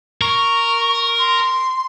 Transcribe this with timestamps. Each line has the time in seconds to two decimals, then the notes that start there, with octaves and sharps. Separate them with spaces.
0.21 A#4 C#6
1.19 C6